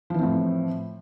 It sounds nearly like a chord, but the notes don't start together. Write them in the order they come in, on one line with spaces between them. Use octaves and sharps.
F3 E3 C4 A2